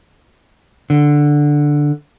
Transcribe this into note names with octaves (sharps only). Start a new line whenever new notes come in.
D3